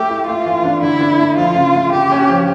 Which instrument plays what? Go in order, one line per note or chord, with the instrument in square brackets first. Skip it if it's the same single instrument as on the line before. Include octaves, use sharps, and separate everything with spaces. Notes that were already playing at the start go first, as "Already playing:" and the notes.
Already playing: [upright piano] A3 A4 [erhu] G4
[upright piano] E4
[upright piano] A3 [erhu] F4
[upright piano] E3
D4
[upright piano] D3 [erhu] E4
[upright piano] D4
A3
[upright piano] F3 [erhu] F4
[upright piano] C#3
A3
[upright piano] C#3 [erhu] G4
[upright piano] C#4
F3